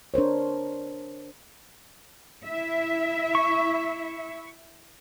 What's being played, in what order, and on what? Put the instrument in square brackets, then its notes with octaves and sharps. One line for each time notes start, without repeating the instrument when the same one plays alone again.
[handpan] D4 A#4 C5 C#5
[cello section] E4 E5
[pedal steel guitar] C#6